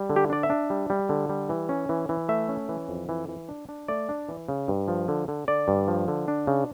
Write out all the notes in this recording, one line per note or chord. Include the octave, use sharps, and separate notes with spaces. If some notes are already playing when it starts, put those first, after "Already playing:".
Already playing: G3
D3
G4
D4 D5
E5
D4
G3
G3
D3
G3
E3
C#4
E3
E3
A3 E5
C#4
E3
F2
E3
E3
D4
D4
A3 D5
D4
E3
C#3
G2
F3
D3
D3
D3 D5
G2
F3
D3
D4
C#3